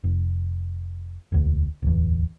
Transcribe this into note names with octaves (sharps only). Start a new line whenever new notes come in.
F1
E1 D2
D1 G1 E2